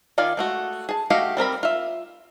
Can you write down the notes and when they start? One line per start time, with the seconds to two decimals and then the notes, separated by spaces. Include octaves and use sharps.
0.18 D#3 F4 D5 F5 G#5
0.37 G#3 A3 F#4
0.89 G#4 A5
1.10 A3 F#4 G4 D#5 F5
1.37 G3 C4 A#4 B5
1.63 F4 E5